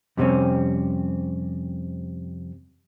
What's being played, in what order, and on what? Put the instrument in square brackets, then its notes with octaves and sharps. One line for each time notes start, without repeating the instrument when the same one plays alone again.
[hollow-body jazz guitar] F2 C3 G3 A#3 C4 C#4